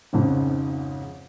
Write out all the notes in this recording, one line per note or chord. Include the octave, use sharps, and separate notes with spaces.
G#1 F2 G#2 C#3